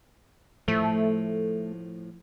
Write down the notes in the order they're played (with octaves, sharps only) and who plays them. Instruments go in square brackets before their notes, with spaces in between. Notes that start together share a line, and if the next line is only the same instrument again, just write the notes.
[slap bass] A2 F3 [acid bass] A3